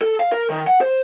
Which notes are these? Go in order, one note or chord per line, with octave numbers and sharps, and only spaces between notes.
A4
F5
A#4
D#3
F#5
C5